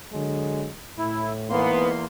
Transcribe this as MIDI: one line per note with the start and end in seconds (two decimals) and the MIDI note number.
0.13 0.69 50
0.13 0.69 54
0.13 0.69 56
0.98 1.67 45
0.98 1.33 64
1.50 2.05 40
1.50 1.88 44
1.50 2.05 58
1.50 1.88 59
1.50 2.05 84